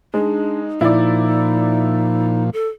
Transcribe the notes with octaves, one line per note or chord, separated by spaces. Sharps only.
G#3 D4 D#4
A#2 F3 D#4 E4 D5
A4